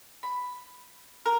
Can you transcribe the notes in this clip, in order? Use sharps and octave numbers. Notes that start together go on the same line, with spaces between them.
B5
A#4